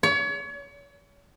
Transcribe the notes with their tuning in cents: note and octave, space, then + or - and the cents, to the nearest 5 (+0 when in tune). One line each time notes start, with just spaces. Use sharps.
C#5 +35